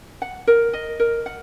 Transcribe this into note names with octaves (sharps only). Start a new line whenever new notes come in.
F#5
A#4
D#5
A#4
F#5